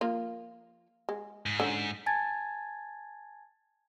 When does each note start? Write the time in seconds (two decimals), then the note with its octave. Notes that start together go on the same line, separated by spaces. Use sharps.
0.01 F3 A#3 F4
1.09 G#3
1.46 G#2
1.60 D3 C#4
2.06 G#5 A5 G#6 A6